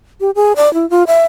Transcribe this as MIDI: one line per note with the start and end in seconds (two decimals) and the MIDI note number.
0.21 0.31 67
0.35 0.53 68
0.56 0.72 74
0.74 0.88 64
0.90 1.03 65
1.07 1.24 76